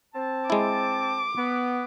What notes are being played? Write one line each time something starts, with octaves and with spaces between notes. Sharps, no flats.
C4 A5
G#3 E4 D6
B3